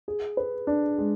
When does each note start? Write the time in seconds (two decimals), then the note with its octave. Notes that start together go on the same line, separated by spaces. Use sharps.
0.08 G#4
0.37 B4
0.67 D4
0.98 G#3